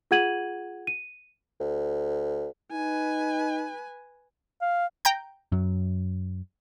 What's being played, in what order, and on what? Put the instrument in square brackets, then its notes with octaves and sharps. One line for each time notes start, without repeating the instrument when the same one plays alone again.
[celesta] F4 G#4 F#5 G#6 D#7 F#7
D#7
[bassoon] D2
[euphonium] D#4 [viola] B4 G#5
[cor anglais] F5
[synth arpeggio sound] G5 A#5 G6
[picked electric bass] F#2 F#3